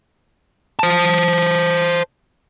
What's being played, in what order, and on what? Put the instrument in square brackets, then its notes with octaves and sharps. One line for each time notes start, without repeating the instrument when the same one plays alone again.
[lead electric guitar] C5 A5